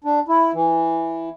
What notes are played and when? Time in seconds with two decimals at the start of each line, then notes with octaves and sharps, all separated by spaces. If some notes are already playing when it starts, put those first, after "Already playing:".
0.04 D4
0.28 E4
0.54 E3